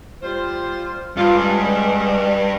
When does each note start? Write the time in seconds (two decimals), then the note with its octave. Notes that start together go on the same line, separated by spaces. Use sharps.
0.22 G3 F4 C5
1.17 G2 F4
1.36 C#3 F#3 G#3